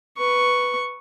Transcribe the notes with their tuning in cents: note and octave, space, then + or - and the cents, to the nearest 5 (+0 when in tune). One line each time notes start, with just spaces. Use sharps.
B4 +0 C#6 +0